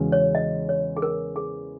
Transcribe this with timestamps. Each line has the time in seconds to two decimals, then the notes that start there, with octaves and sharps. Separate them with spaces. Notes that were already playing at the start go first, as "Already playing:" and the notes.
Already playing: E2 C#3 G#3 C#4 F#4
0.12 C#5
0.35 D#5
0.69 C#5
0.97 G#4
1.02 A#4
1.36 G#4